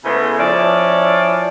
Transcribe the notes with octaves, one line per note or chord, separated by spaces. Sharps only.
C#3 G#3 A3 B3 E4 C5
F3 C#4 E4 D5